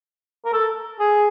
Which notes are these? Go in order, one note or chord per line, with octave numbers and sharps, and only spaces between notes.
A#4
A4
G#4